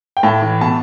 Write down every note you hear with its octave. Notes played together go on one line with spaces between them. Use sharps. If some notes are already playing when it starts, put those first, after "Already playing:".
G5
A2 A5
E3
B2 A5